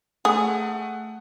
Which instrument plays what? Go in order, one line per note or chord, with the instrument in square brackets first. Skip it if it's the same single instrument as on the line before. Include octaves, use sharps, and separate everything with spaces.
[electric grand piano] A3 F#5 [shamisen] G#4